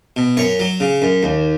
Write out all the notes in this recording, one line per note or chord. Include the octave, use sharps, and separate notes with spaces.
B2
F#2 C#5
F#3
C#3
F#2
D#2